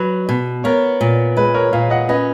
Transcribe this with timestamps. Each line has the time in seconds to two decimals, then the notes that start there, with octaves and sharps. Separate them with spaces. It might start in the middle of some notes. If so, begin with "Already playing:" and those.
Already playing: F#3 B4
0.29 B2
0.64 B3 A#4 C#5
1.01 A#2
1.37 G#3 B4
1.54 A#4 C#5
1.72 A#2 C#5 F5
1.90 D#5 F#5
2.09 C#4 B4 D#5